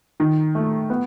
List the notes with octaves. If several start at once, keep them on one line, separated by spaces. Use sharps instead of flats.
D#3
A3
B3